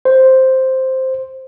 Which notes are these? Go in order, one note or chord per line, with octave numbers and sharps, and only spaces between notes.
C5